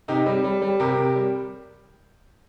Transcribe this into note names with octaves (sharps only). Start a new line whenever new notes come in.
C3 D#4 G4
G3
G3
G3
C3 G4 A#4
C3
G3